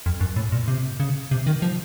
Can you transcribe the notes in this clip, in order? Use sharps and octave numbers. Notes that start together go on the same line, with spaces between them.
F2
F#2
A2
A#2
C3
C#3
C3
D#3
F3